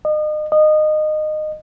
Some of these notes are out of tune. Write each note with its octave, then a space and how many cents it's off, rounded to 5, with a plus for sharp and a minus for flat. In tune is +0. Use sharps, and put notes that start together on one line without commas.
D#5 -35
D#5 -20